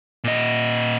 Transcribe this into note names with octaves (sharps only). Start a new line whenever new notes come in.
A#2 D#5